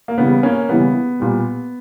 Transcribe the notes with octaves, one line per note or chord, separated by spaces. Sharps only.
A#3
C#3 E3 G3 B3
A#3 C#4
C#3 E3 G3 B3
A#2 G3